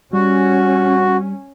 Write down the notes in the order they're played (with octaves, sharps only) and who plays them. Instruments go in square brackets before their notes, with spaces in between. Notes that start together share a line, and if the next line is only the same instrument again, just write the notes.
[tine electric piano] G3 [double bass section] C#4 [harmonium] F#4